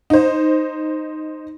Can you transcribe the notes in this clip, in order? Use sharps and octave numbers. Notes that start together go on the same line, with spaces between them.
D#4 C5